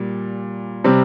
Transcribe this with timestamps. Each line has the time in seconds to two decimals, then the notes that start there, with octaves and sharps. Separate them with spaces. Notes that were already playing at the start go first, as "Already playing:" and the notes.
Already playing: A#2 G3
0.84 C3 G3 C4